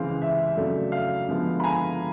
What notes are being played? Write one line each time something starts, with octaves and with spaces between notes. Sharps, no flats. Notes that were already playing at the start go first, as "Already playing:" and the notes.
Already playing: C#2 C3 E3 G#3 C4 F5
E5
F2 C#3 F#3 A3 D4
F5
D3 F3 G#3 B3
B5
G#5 A#5